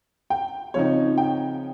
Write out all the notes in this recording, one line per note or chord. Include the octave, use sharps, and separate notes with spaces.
G5
C#3 F3 C4 D#4 C#5
G5